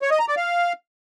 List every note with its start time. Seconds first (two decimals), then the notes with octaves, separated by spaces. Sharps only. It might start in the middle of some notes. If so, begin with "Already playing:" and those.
0.02 C#5
0.11 D#5
0.20 A#5
0.28 D5
0.37 F5